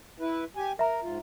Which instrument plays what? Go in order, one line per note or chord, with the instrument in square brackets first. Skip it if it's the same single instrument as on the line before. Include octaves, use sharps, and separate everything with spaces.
[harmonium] E4 B4
G4 G#5
[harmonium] A#4 [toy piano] E5 A#5
[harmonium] G#2 F4